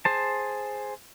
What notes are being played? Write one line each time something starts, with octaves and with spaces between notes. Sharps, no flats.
G#4 C5 A5